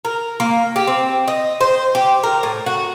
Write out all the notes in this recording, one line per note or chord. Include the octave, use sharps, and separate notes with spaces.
A#4
A#3
G4
C4
D#5
C5
G4
A#4
A2
F#4